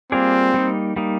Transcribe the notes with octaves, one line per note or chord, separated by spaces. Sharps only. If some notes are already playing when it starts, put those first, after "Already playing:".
G3 A#3 C4 F4 G#4 D5
G3 A#3 D#4
G3 A#3 D#4